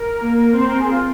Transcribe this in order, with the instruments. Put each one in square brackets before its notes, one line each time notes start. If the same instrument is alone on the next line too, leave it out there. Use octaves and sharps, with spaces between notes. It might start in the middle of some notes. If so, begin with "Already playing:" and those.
Already playing: [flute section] A#4
[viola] A#3
[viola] C4 [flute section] C5
[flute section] A#4
G#4
F4